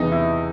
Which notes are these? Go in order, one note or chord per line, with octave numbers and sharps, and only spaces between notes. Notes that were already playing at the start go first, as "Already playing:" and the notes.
Already playing: E2 C3 E3 D#4
E4